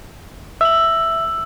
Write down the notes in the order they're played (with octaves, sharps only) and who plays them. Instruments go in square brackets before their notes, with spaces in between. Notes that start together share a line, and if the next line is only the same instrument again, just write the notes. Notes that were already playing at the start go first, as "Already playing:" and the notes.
[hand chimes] E5 [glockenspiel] E6 F#7